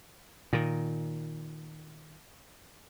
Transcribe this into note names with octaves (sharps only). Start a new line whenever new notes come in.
A#2 D#3